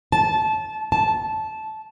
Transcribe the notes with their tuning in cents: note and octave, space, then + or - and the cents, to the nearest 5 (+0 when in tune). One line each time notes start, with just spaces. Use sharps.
A5 -20
A5 -15